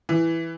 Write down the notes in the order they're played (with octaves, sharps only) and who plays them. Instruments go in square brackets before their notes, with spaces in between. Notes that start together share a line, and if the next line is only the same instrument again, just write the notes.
[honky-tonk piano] E3